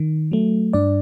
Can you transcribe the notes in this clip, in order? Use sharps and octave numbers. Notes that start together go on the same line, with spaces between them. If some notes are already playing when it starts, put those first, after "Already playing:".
Already playing: D#3
F#3 A3
G2 D4 D5